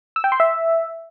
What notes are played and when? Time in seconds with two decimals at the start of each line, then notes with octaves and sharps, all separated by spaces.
0.16 E6
0.24 G5
0.32 C6
0.40 E5